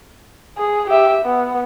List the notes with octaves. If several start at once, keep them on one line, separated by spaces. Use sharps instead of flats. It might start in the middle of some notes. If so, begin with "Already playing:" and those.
G#4
G4 E5
B3